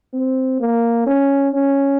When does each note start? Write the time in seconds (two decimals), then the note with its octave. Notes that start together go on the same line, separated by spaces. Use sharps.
0.13 C4
0.60 A#3
1.07 C#4
1.54 C#4